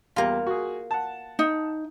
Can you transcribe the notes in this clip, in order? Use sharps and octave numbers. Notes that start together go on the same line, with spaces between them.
E2 G3 A#3 F4
F#4 G#4
F#5 A5
D#4